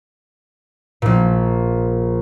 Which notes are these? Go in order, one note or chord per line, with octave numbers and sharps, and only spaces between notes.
A#1 A#2